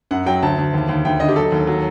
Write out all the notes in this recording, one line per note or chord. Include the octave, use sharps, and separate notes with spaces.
F#2 F#5
F#3 G5
D2 A5
D2
D#2
D#2
D2 G5
D3 D#5
G4
F#3 A4
D#2
F#3